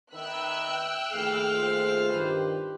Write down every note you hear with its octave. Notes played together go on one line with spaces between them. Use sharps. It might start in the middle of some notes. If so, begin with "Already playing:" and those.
D#3 B4 E5 G5 E6 F#6
A#1 D#2 E3 A3 G#4 F5
F4 C5
G2 D#3 G4 B4